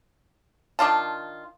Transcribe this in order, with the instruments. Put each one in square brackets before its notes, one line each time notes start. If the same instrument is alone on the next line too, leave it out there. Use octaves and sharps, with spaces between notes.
[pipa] D#3 D4 F4 A5